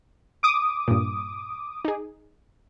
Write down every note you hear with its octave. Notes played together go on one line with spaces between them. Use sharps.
D6 D#6
G2 A#2
D#4 G#4